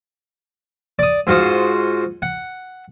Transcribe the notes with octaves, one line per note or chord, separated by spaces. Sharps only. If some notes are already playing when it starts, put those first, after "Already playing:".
D5 D#6
G#2 F4 F#4 C5 D#6
F#5